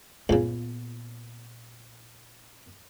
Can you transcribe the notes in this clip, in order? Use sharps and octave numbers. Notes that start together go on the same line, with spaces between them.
C#2 A#2 C#3 B3